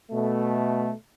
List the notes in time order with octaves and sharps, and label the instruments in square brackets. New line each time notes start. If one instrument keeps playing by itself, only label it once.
[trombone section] B2 A3